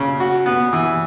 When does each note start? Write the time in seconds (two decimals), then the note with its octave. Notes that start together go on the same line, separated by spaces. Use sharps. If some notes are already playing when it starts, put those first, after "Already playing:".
Already playing: C#3
0.20 F#4
0.46 B3
0.73 E3